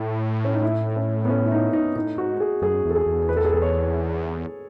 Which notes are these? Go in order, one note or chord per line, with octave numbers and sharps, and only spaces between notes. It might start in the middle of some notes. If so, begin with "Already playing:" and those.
Already playing: A2
C#4
D#4
E4
C#4
B3
C#4
E4
D#4
D#4
A2 D#4
G#2 F#4
G#4
F#2 G#4
E2
A4
G#4
E2
B4
A4
G#4
A4
C#5